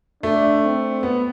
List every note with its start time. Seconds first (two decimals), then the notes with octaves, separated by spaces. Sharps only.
0.23 A3 D4
0.64 C4
1.03 B3